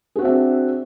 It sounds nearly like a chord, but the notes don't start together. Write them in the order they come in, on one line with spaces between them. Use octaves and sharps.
G#4 F#4 C4 E5 D4